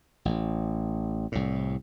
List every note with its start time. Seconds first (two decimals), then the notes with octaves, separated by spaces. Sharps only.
0.25 A1
1.32 C2 A2